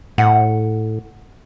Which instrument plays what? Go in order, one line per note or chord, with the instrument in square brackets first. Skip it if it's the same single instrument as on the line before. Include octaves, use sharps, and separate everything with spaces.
[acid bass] A2 [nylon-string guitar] F#5